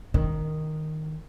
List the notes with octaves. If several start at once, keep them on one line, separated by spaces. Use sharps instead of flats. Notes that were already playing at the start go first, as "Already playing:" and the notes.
D#3